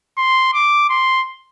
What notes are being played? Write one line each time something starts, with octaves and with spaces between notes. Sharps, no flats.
C6
D6
C6